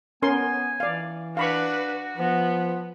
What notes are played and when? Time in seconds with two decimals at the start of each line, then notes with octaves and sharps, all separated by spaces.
0.22 B3 C#4 A#4 G#5 C6
0.80 E3 D5 F5
1.37 D4 F#4 B4 F5 B5 C#6
2.17 F3 B3